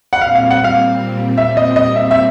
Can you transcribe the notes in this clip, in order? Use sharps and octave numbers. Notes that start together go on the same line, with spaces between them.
F#5
A#2 G3 C4 F5
F5
F#5
F5
E5
D#5
D#5
E5
E5